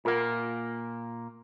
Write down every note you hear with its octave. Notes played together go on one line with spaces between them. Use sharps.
A#2 A#3 F4 A#4 F#5